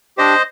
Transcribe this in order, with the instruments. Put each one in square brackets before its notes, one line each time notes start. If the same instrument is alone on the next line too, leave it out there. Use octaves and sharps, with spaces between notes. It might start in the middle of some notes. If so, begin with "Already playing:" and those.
[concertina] D4 G4 C5 D#5